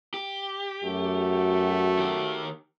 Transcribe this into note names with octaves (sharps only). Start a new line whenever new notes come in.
G4
F#2 A3 F#4
D#3 G4